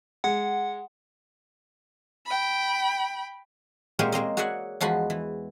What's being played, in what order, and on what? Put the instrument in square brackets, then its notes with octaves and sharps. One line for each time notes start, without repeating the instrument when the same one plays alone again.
[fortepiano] G#3 [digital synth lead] F#5
[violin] G5 B5
[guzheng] A#2 G#3 A#3 C4 G4 C#5
G#3 A#3 C4 D#5
F#4 G#4 C#5 D5 E5 F#5
E2 F3 G#3 F#4 B5
E3